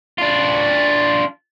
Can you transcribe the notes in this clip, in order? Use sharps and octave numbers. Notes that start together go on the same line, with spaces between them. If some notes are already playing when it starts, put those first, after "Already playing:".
D4 F4